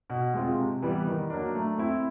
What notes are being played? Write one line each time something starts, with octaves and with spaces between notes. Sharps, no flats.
B2
G#3 C4 F4
C3
E3 G3 B3
D#3
F#3 A#3 D4
A3
C4 E4